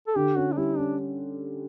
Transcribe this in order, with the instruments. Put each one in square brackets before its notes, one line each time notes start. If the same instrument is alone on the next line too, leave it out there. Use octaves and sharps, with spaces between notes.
[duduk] A4
[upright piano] D3 [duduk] G4
[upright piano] C#4 [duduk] F#4
[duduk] D4
[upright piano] G3 [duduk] E4
[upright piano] C#4 [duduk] D4